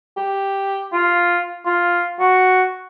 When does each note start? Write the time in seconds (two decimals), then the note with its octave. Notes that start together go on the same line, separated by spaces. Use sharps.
0.17 G4
0.93 F4
1.66 F4
2.20 F#4